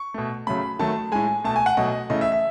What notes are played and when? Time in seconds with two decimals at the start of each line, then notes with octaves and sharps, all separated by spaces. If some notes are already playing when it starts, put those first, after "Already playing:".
Already playing: C#6
0.14 B2 A3
0.47 C#3 F#3 A3 B5
0.79 D#3 F#3 A3 A5
1.12 A2 G#3 G#5
1.44 B2 A3 A5
1.56 G#5
1.66 F#5
1.77 B2 F#3 A3 D#5
2.10 C#3 E3 A3 D#5
2.21 E5
2.32 E5